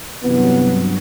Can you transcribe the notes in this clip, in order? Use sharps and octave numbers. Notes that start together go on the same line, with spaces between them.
G2 C3 E3 F#3 B3